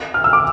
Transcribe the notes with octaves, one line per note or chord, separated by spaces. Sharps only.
F6
E6
D6